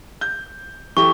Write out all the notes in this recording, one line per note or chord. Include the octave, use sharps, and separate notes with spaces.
G6
E3 G4 A4 C#6